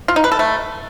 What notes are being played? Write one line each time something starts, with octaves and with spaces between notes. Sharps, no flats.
F4
D#4
B4
A4
A3